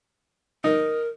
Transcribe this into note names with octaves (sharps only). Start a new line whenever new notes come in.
D#4 A#4